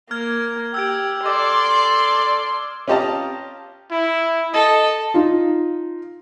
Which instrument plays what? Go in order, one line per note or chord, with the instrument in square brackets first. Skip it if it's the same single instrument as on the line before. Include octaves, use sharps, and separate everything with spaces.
[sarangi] A#3 [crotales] F6 G#6
[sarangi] G4 [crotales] E6 G#6 D7
[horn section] A4 D5 [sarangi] C6 [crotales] D6
[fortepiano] C#4 F4 G4 D#5 A5 A#5
[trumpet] E4
[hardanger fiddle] A4 [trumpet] D#5
[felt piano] D#4 F4